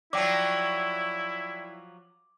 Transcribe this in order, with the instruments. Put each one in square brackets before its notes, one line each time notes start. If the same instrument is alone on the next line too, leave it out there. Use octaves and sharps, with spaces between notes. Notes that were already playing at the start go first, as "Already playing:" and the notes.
[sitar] F3 F#3 [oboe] E4 [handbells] D5 G5 [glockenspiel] D6